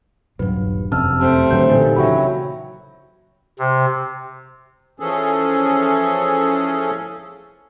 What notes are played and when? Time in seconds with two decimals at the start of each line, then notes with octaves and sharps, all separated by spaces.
0.39 D#1 G2 F#3 B4
0.92 F#1 F2 C3 A5 E6 F6
1.20 G3 A3 C4 A5
1.51 A2 D3 F#3 B4 C5 G6
1.69 A#2 E3 D#4 G4 A4
1.96 C#3 F#3 E5 G5 B5
3.59 C3
5.00 E3 F3 C#4 G#4 A4